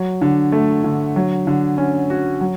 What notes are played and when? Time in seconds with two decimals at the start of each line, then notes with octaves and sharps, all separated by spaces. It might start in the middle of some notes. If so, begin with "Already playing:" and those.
Already playing: F#3
0.21 D3
0.52 A3
0.84 D3
1.16 F#3
1.47 D3
1.78 C#4
2.10 F#4
2.41 F#3